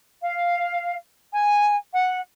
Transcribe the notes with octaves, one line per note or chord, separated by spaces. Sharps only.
F5
G#5
F#5